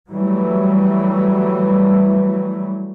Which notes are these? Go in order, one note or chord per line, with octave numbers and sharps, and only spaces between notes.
E3 F#3 G3 A3